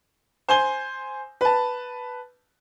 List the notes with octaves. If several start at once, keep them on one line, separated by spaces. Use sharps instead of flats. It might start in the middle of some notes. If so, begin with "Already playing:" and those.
C5 G#5 G7
B4 A5